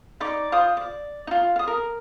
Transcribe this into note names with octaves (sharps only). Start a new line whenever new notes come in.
D#4 D5 D6
F4 C5 D#6
D5
D#4 F4
F5 D#6
A#4